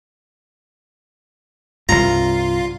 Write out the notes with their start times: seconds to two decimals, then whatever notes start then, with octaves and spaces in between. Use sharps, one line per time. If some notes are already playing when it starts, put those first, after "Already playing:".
1.89 C2 G2 F4 A#5